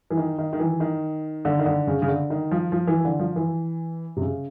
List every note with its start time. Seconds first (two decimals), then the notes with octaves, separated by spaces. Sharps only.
0.10 E3
0.17 D#3
0.38 D#3
0.53 D#3
0.59 E3
0.80 D#3
1.45 D3
1.59 D#3
1.66 D3
1.87 C#3
2.02 C#3
2.08 D3
2.30 D#3
2.51 F3
2.72 F3
2.87 E3
3.05 D3
3.19 F3
3.36 E3
4.17 C3
4.21 C#3